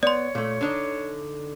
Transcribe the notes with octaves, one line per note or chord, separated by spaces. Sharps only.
B3 C#5 D5 C6
A#2 A3
D3 D4 D#4